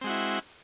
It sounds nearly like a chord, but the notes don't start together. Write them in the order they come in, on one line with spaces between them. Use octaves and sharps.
C4 G#3 F#4 E4